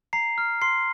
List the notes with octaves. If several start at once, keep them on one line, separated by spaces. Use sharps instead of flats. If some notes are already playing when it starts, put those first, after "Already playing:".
A#5 C7
F6
C6 C7